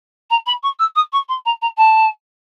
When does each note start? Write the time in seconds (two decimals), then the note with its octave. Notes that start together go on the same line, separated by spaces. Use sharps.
0.30 A#5
0.46 B5
0.63 C#6
0.79 E6
0.96 D#6
1.13 C#6
1.28 C6
1.45 A#5
1.62 A#5
1.77 A5